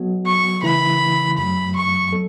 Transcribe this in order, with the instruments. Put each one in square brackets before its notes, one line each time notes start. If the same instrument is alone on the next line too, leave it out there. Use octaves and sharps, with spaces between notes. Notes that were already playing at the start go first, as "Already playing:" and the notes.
Already playing: [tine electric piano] F#3 B3 F#4
[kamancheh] C#6
[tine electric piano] C#3 E3 A3 E4 [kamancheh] B5
[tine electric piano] F#2 F#3 A3 [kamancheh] B5
[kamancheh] C#6
[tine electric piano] F#3 B3 A4